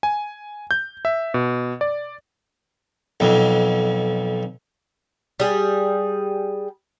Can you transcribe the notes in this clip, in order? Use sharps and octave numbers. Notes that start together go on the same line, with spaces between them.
G#5
G6
E5
B2
D5
B1 F2
G3 G#4